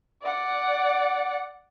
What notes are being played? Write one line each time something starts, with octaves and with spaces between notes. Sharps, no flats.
D5 F#5